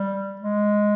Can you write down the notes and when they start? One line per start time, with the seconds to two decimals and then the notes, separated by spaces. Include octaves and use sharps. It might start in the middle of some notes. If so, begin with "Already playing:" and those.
Already playing: G3
0.41 G#3